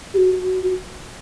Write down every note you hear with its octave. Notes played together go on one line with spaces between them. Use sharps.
G4
F#4